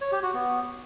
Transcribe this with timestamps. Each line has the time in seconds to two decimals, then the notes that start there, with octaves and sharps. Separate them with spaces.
0.01 C#5
0.12 G4
0.23 F#4
0.34 B3